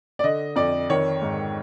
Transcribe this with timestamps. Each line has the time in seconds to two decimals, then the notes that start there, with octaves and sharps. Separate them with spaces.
0.19 D5
0.24 D3 D#5
0.56 F2 D5
0.90 D#3 C#5
1.21 G#2